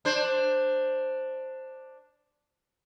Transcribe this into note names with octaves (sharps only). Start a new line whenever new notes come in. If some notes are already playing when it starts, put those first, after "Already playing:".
D4 C5